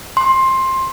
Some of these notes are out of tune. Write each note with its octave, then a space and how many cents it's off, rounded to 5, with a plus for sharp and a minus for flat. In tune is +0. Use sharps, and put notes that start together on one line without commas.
C6 +15